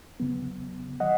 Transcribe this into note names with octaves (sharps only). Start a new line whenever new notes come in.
E2 C#3 F#3 B3
D#3 F#3 D#5 F#5